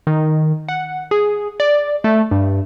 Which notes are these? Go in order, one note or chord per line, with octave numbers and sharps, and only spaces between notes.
D#3
F#5
G#4
D5
A3
G2